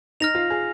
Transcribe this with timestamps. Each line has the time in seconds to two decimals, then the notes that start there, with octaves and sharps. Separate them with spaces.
0.20 D#4 F6 A#6 F7
0.35 F4
0.50 G#4